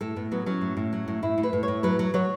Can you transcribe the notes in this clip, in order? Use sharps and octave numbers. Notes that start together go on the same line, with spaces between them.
A2 A4
A2 B3
F#3 B3
F#3 C#4
A2
A2
F#3
A2
A2 E4
A2
B4
A2
C#5
A2
F#3 B4
F#3
F#3 C#5